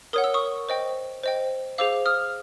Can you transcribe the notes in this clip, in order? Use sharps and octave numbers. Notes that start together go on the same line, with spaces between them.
A#4 C#5 F#5 D#6
E6
C#6 D#6
C5 D#5 G5
C5 D#5 G5
G#4 C5 F5 D6 E6
D#6 F6